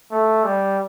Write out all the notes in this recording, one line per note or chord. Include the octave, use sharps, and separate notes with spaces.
A3
G3